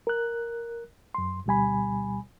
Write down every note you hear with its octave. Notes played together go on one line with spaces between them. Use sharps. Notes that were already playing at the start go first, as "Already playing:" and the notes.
A#4 F#6
F#2 C6
D2 B2 G3 G#5 B5